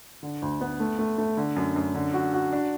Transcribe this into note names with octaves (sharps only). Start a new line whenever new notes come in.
D3
D2
B3
A3
A3
A3
D3
F#2
F#2
D3
F#4
F#4
D4